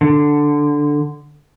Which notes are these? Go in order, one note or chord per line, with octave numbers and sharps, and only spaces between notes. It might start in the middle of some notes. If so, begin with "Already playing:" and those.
D3